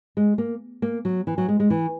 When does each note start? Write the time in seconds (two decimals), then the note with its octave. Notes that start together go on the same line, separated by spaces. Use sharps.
0.17 G#3
0.38 A#3
0.82 A#3
1.05 F#3
1.27 E3
1.38 F#3
1.48 G#3
1.60 G#3
1.70 E3